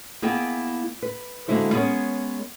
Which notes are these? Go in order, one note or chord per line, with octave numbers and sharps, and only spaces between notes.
A#3 B3 E4 G#4 D#5 G5
B4
D3 G#3 A#3 E4 F#4 C5
G#3 B3 C#4 G#4 A#4 C#5